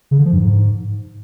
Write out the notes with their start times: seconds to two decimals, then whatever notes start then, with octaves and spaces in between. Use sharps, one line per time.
0.11 C#3
0.18 D3
0.26 F3
0.33 G2
0.40 G#2